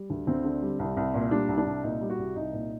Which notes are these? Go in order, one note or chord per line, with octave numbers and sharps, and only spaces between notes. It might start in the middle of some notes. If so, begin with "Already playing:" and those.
Already playing: G3
D2
D2 C4
D3
G3
C2
C2
A#2
G3 D4
C2
D4
C2
A#2 D#4
G3
F#4
C2
C2 D#4
A#2